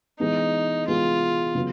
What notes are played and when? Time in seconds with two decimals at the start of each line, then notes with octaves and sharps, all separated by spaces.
0.20 E3 G#3 B3 D#4
0.87 E3 G#3 B3 F4
1.55 C#3 F#3 B3